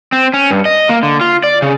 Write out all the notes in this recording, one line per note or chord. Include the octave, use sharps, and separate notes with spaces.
C4
C#4
G2
D#5
A#3
D3
F4
D5
C#3